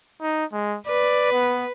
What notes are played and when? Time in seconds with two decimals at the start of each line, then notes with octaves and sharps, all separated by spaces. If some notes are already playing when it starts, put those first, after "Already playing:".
0.21 D#4
0.53 G#3
0.87 B4 D5
1.33 B3